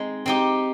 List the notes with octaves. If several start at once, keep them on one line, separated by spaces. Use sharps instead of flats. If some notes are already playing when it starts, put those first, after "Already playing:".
Already playing: G#3 C4 D#4
C4 D#4 G4